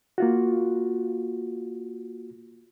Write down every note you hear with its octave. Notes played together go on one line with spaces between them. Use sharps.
A#3 F4 F#4